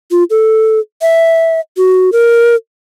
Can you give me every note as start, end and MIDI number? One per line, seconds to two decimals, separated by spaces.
0.11 0.23 65
0.30 0.79 69
1.02 1.60 76
1.77 2.10 66
2.12 2.55 70